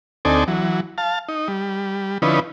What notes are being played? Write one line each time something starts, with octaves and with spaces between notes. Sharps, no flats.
D2 C4 D#4 A4 D5 G#5
E3 F#3
F5 A5
D#4
G3
D3 F3 C#4 D#4 E4 B4